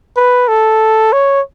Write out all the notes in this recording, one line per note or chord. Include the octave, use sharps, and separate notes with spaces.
B4
A4
C#5